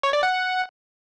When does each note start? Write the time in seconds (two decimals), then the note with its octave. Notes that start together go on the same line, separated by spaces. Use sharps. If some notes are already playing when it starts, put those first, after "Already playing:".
0.03 C#5
0.13 D5
0.23 F#5